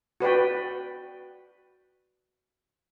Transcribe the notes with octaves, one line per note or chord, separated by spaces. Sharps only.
F#4 B4 D5 G5